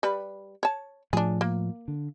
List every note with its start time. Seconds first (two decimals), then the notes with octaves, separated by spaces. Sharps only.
0.03 G3 B4
0.63 C#5 A5
1.13 A2 F3 D4 G#4
1.41 A#3
1.88 D3